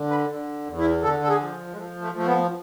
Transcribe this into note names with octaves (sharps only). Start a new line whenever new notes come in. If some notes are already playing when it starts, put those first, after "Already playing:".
Already playing: D3
B4
D3
E2
E4
D3 A4
A4
G#4
F3
G#3
F3 A3
A3
F3 A3
B3